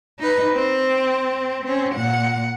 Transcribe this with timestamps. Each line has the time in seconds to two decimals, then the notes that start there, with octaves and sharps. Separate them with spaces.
0.19 D#4 B4
0.53 C4
1.65 C4 C#4
1.95 A#2 F#5